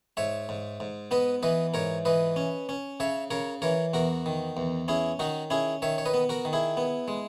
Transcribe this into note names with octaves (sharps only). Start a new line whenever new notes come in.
G#2 C#5 E5
G#2
G#2
B3 B4 D#5
E3 B4 D#5
G#2 A#4 C#5
E3 B4 D#5
C#4
C#4
C#3 C#5 E5
C#3 A#4 C#5
E3 A#4 C#5
E2 F#4 A#4
D#3
E2
C#4 E4 G#4
D#3 D#4 F#4
C#4 E4 G#4
D#3 C#5 E5
C#5
B4 D#5
B3
F#4 A#4
D#3
E4 G#4
B3
G#3